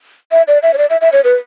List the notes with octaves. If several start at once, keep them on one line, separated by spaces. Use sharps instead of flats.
E5
D5
E5
C#5
D5
E5
E5
C#5
B4